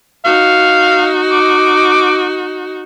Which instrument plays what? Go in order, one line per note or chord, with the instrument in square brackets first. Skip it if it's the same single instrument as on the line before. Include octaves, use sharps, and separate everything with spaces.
[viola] D#4 F#4 [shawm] F5
[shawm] D6